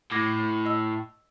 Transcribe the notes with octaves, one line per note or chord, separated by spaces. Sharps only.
A2 D6 G#6 A#6
D#5 E6